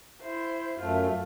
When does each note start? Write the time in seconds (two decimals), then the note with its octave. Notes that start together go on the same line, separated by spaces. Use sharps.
0.21 E4 C5
0.78 F#2 A3 F4